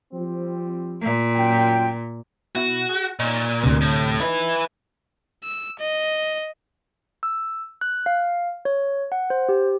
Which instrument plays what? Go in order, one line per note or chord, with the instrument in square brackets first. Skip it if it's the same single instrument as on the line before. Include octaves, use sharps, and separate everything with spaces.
[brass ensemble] F3 G3 C4
[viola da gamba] A#2
[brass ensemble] F#2 F4 G5
[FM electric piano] B2 E4 [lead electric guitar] F#4
[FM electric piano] G#4
[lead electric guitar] A#2 [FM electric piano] D#4 C#5 F6
[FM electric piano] D2 C3
[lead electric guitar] A2
[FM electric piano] D#4 [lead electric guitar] E4 B4
[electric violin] E6
D#5
[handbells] E6
F#6
F5
C#5
F#5
C5
G4